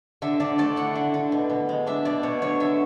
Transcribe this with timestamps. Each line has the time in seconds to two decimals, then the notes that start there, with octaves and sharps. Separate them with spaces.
0.22 D3 E5
0.40 D3 D5
0.58 A3 D5
0.76 E4 F#5
0.95 D3
1.14 D3
1.32 B2
1.50 B2
1.69 G#3
1.86 D4 E5
2.05 B2 D5
2.23 B2 C#5
2.42 D3 C#5
2.60 D3 E5